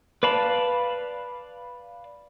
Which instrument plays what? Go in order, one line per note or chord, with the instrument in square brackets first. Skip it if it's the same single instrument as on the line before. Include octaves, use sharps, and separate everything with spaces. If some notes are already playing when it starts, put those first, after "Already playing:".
[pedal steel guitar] B4 D5 F5 A5 B5